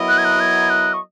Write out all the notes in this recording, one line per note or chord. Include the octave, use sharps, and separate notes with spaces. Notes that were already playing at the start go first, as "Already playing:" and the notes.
Already playing: F#3 B3 E4 A#4 D#5
F#6
G#6
F#6
G#6
F#6
C#6